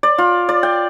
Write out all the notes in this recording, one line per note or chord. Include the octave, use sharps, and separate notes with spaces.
D5
F4
D5
G5